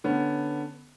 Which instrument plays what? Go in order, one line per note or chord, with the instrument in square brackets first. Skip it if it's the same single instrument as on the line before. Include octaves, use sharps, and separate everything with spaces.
[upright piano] D3 B3 C#4